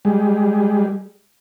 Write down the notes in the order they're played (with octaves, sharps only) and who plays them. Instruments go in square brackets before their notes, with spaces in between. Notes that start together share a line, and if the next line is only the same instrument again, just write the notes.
[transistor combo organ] G3 G#3